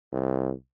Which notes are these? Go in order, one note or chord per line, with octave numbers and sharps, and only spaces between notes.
C2